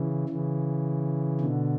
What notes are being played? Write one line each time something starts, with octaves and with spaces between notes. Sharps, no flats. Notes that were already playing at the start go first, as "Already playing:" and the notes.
Already playing: C#3 E3
C#3 E3
B2 D3